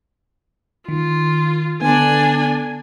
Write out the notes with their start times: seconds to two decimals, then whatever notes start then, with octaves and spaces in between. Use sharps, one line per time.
0.89 D#3 F4
1.82 D3 B3 D4 G#5